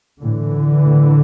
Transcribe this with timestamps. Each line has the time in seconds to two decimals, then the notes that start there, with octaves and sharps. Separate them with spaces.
0.22 A2 D3 E3
0.84 A2